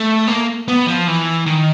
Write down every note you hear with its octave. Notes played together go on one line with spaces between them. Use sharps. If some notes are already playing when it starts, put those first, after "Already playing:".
Already playing: A3
A#3
B3
F3
E3
D#3